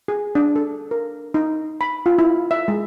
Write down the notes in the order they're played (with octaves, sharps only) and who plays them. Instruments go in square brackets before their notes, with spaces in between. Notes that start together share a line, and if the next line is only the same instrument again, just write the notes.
[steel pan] G#4
D4
A4
A#4
D#4
B5
F4
E4
E5
G#3